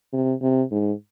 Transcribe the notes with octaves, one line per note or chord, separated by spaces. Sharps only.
C3
C3
G#2